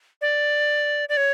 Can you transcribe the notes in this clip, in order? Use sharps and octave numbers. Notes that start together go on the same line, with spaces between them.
D5
D5
C#5